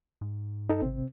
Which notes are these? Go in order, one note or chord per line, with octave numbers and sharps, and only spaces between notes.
G#2
G2 D#4 A4
G#1 C3 C4